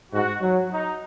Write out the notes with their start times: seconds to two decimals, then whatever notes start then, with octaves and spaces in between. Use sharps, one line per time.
0.12 G#2 F#4
0.42 F#3
0.71 D#4